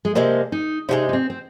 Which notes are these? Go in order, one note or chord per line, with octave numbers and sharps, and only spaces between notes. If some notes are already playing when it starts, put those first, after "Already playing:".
G#3
C3 F3 G#3 A#3
D#4
C3 F3 G#3 D#4
D#4
C4
C4